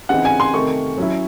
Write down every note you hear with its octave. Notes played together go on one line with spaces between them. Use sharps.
C#3 E3 C4 D#4 F#5
G#5
C6
C3 D#3 A3 C#6
F#3 C#4 E4